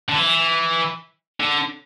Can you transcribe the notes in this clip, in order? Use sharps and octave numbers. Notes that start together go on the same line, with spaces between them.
D3
E3
D3